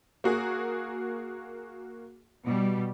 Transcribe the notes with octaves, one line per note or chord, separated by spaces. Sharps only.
A#3 F#4 G#4
B2 G3